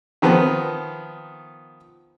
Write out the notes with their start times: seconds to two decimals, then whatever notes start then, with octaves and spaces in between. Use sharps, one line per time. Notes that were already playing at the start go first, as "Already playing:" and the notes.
0.22 D#3 F3 B3